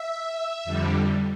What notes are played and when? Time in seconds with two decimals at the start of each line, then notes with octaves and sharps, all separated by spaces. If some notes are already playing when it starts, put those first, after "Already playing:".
Already playing: E5
0.65 F2 D3 G3